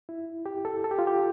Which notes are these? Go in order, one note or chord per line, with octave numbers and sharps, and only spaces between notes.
E4
G4
A4
A4
G4
F4
G4